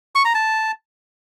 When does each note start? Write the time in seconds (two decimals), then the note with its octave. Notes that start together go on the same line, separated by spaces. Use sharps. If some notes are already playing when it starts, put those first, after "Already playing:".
0.15 C#6
0.25 A#5
0.35 A5